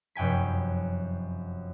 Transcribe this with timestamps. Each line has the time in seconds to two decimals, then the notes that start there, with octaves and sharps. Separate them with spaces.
0.15 F1 F#2 G5 G#5 B6